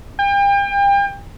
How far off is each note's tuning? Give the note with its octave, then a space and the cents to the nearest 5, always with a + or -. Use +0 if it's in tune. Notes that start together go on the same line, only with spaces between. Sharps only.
G5 +35